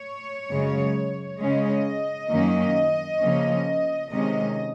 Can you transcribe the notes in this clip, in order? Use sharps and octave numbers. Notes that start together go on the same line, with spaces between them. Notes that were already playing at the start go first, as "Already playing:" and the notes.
Already playing: C#5
F#2 C#3 G#3
C#3 G#3 C#4 D#5
F#2 D#3 F#3 A#3 C#4
C#3 F3 A#3 C#4
C3 D#3 G#3 C#4 D#5